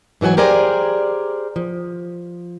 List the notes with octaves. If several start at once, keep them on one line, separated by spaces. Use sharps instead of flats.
G#2 E3 F#3 F#5 G#5
G4 G#4 A#4 C5 D5 G#5
F3